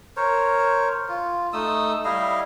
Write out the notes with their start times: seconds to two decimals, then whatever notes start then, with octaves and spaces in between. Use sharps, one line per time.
0.17 A#4 C5 C#5
1.09 F4
1.53 A3 D#4 D#6 E6
2.05 G3 E4 D#5 F5